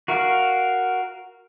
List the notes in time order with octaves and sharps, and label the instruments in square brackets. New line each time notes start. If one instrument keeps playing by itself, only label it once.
[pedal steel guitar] F#4 A#4 F5